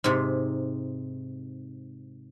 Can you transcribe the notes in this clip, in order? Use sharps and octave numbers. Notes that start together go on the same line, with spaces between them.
G#2 C3